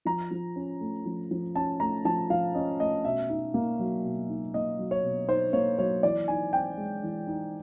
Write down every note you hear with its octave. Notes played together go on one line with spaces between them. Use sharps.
F3 A#5
F3
C#4
A3
F3
F3
C#4 A5
A3 A#5
F3 A5
F3 F5
C#4 D#5
A3 D#5
B2 E5
D#4
A#3
F#3
B2
D#4
A#3 D#5
F#3
C#5
B2
D#4 C5
A#3 C#5
F#3 C#5
E3 D5
D#4 G#5
C4 G5
G#3
E3
D#4